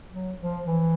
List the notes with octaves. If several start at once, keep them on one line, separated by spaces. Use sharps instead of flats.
F#3
F3
E3